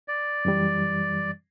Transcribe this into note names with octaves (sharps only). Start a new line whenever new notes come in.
D5
F#2 E3 G3